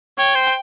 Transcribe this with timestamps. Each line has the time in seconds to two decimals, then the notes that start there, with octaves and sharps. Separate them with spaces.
0.18 C#5 G5
0.35 C5